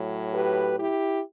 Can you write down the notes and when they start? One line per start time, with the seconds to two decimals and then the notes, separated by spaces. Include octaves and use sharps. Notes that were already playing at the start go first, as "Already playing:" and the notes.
Already playing: A2 F#3
0.32 G4 B4
0.78 E4 G4